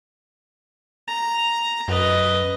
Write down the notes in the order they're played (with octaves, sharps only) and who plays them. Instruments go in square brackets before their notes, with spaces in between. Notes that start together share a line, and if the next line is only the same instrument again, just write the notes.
[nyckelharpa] A#5
[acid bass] F#2 [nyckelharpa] B4 D#5